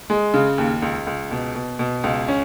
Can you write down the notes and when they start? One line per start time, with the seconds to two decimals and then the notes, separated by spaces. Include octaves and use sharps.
0.10 G#3
0.34 C#3
0.58 D#2
0.82 C#2
1.07 C#2
1.31 B2
1.55 B2
1.79 B2
2.04 C#2
2.28 C#4